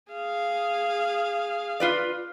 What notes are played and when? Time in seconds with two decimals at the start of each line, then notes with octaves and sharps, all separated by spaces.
0.12 G#4 F5
1.80 F4 B4 D5